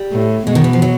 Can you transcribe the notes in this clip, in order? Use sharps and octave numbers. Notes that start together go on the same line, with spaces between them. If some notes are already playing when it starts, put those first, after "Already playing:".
Already playing: G3
A2
B2 G#3
D#3
E3
F3
F#3